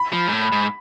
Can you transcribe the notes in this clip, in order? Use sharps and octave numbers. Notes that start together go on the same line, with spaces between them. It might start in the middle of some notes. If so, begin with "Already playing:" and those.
Already playing: B5
F3
G#2
A2
G#2